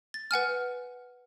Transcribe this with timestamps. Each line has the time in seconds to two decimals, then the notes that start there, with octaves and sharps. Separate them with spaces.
0.14 A6
0.31 B4 F#5 G#5 F6